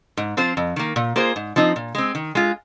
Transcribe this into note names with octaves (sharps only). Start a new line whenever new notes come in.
G#2
F3 C4 F4 C5
F2
D#3 A#3
A#2
A#3 F4 G#4 C5
G#2
F3 C4 D#4
A#2
G#3 C4
D#3
G#3 F4